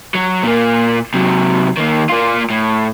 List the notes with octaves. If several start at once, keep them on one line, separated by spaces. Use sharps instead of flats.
F#3
A#2 A#3
C3 F#3
D#3 A#3
A#3 F4
A2